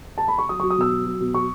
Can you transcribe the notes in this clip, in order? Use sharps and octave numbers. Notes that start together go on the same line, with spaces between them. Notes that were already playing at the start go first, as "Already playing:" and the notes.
A5
B5
C#6
F#3 D#6
F#3 C#6
D#6
B2 E6
F#3
F#3
B2
F#3 C#6